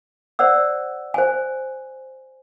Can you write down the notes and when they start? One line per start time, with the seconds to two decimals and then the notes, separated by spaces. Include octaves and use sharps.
0.39 C5 D5 F#5 E6
1.14 C5 G#5